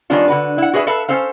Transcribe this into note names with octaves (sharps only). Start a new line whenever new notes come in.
D#3 G3 B3 C#4 D4 F4
D3 F#4 B4
E4 F#5
F#4 G#4 B4 D#5 E5
A4 B4 E5 F5 A5
C#4 A4 C5 F5